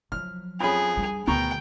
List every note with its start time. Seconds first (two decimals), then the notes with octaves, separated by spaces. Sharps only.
0.12 F3 F#3 F6
0.61 F2 C#4 G#4 B5
0.97 G3 D4
1.27 D2 B2 D#3 G5 A#5 C#6